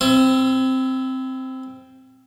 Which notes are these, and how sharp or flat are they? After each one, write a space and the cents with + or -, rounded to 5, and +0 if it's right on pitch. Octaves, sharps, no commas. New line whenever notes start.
C4 +0 E4 +35